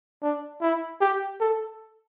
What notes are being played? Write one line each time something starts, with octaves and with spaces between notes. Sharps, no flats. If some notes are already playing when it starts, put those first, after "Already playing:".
D4
E4
G4
A4